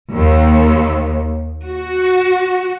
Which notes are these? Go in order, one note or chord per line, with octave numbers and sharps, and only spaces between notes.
D#2
F#4